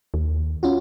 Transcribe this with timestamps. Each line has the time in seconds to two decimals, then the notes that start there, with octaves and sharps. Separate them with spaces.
0.14 D#2
0.63 C#4 F4 F#4